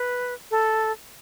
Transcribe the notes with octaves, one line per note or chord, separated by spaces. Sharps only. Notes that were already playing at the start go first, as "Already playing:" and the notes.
Already playing: B4
A4